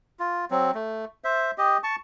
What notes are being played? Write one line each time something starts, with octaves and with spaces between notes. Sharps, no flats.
F4
F#3 C4
A3
C5 E5
G4 D#5
A5 C#6